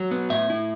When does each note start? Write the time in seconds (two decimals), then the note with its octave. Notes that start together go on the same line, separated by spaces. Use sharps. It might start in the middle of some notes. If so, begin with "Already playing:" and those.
Already playing: F#3
0.11 B3
0.30 A2 E5
0.50 E4